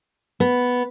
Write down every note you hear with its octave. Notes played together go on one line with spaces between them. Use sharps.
B3